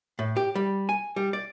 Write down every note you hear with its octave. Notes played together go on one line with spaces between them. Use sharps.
A2
G4
G3
G#5
G3
D5